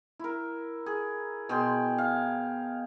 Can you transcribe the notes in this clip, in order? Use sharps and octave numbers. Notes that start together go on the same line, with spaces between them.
E4 A#4
G#4
B2 G#4 G5 C6
F5